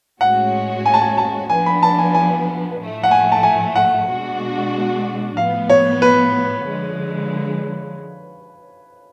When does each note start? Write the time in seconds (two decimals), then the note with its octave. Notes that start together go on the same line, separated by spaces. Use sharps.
0.20 A2 G#3 C#4 F#4 F#5
0.86 G#5
0.94 A5
1.01 G#5
1.18 A5
1.50 F3 B3 D4 G#5
1.66 B5
1.83 A5
1.98 G#5
2.14 G#5
2.79 A2 F3 A3
3.04 F#5
3.11 G#5
3.32 A5
3.43 G#5
3.76 F#5
4.08 B2 G#3 D4 F#4
5.37 A2 F3 B3 F5
5.70 C#5
6.02 B4
6.66 D3 F3 G#3